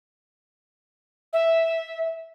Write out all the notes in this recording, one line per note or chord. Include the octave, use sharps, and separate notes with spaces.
E5